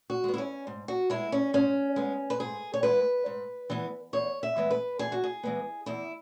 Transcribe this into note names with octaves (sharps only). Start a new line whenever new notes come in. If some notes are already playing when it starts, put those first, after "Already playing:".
F#4
G#3 B3
E4
C#4
G#2
F#4
G#3 B3 E4
C#4
G#2 C#4
G#3 B3
B4
G#2 G#4
C#5
E3 G#3 B3 B4
G#2
E3 G#3 B3
E2 C#5
E5
E3 G#3 B3
B4
E2 G#4
F#4
G#4
E3 G#3 B3
E2 E4